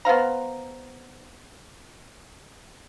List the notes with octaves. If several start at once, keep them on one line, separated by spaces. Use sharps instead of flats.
B3 C5 F5 A#5